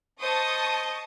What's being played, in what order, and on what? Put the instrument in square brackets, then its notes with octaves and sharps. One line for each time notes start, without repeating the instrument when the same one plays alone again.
[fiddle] C5 D#5 [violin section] A5 C#6 D#6